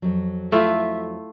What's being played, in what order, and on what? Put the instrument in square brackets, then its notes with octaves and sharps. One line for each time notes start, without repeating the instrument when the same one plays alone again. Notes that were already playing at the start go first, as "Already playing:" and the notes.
[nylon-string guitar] F2 F#3
[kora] A3 E4 F4 [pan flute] E5